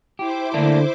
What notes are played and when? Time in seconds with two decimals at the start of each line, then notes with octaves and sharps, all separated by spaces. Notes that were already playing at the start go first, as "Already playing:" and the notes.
0.19 E4 G4 C5 D6
0.54 D3 A3 A#3 D4